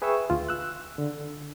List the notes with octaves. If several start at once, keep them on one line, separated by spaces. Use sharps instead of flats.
G#4 B4 E5 G5 C#6 E6
D2 F4
E6 F#6
D3